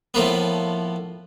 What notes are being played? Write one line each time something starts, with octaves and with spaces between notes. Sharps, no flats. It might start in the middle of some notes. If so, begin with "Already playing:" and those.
A2 F3 A#3 B3